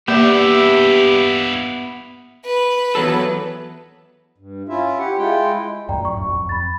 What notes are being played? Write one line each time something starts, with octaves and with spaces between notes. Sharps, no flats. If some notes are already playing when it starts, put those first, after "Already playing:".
G2 A#3 B3 E4 G4 D5 E5
B4
E2 F#3 A4
G2
C#4 E4 F4 E5
G4 F#5
G#3 E4 F4 G5
F#2 A2 F#3 D5 G5 A#5
C#6
F#2
F2
F2 B5 A6